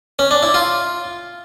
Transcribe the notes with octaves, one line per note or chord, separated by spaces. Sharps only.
C#4
D4
E4
F4